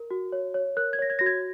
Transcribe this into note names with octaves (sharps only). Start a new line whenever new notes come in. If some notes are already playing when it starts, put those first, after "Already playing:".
Already playing: A#4
F#4
C#5
C#5
A#4 F#6
G#6
C#5 A#6
G#6
F#4 A#6
G#6